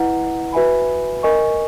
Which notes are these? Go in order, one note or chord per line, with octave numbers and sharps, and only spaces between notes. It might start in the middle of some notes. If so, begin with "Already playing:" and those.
Already playing: E4 B4 D#5 F#5 A#5
F#4 B4 E5 G#5 B5
A#4 D#5 G#5 C#6